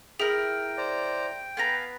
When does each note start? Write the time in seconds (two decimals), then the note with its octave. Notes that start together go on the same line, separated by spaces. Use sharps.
0.20 E4 G#4 A#4 G5
0.77 C5 D5 A#5
1.57 B3 B4 F5 G#5 A#5